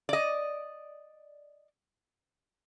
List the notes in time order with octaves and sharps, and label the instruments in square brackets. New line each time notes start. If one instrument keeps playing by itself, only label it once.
[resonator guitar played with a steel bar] D5 D#5